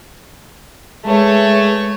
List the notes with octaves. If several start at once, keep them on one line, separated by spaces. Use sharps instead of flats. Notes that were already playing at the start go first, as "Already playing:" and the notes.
G#3 A3 G#4 B4 C#5